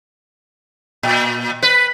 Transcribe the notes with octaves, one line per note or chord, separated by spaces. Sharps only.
A#2
B4